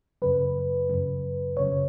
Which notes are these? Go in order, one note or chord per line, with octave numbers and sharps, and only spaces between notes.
F#2 C#3 F#3 B4
F#2 C#3 F#3
F#2 C#3 F#3 C#5